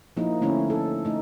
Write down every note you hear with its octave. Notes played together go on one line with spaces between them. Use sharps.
F3 A#3 D#4 E4
D3 A3 C#4 E4
A4
A3 D#4